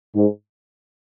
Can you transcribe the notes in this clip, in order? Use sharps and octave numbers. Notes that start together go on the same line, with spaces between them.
G#2